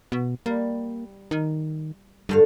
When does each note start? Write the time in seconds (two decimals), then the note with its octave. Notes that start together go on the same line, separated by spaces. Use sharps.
0.12 B2
0.46 G3 A#3
1.31 D#3
2.29 G2 D3 A3 F5